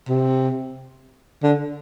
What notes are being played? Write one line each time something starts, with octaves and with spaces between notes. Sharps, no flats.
C3
D3